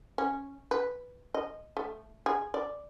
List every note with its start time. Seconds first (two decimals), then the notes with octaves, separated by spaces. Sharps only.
0.18 C#4
0.71 B4
1.34 D#5
1.77 A3
2.26 G#4
2.54 D5